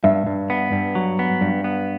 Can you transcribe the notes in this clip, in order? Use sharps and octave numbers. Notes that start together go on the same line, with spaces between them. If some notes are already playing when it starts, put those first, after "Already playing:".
G2 E5
G2
B3
G2
F#3
B3
G2
B3